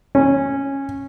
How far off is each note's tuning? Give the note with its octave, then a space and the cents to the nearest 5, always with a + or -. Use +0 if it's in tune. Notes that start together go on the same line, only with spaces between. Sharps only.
C#4 -10